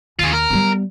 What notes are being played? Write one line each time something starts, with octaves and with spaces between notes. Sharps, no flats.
D#2 F4 G#4
A#4
G3 B3